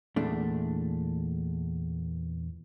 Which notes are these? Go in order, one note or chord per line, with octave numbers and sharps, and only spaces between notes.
E2 A#2 A3 D4